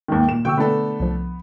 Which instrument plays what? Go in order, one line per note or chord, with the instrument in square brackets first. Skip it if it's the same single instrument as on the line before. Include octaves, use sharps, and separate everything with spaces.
[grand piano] D#2 G#2 D#3
A#2 E7
[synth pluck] B2 D3 [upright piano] G5 C#6 E6
[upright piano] A3 D4 A4 [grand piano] B3
[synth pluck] C2 F3